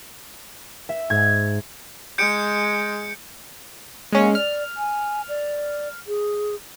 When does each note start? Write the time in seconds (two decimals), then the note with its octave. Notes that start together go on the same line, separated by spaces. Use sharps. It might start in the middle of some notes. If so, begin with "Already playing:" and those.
0.89 E5
1.10 G#2 G#6
2.18 G#3 G6 C#7 D7
4.13 G#3 A#3 C#4
4.35 D5 F6
4.77 G#5
5.29 D5
6.08 G#4